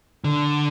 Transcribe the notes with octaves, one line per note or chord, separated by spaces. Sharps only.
D3